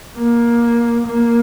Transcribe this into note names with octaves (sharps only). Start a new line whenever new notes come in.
A#3
A#3